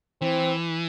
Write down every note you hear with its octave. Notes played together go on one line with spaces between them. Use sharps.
E3 C4